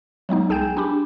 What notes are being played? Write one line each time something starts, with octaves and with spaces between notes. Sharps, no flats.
F#3 G#3 B3 D#4
C2 G#4 G5 G#5 G6 E7
D4 G4 B5 D6